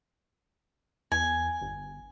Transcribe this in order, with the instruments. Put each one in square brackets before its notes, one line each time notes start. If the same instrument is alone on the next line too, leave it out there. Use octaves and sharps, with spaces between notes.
[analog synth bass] E2 [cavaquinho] G#5
[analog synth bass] G1